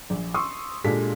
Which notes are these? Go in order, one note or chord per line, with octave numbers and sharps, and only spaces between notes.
A#1
C6 C#6 D#6 E6
A#2 G#3 D4 G4 A4 B6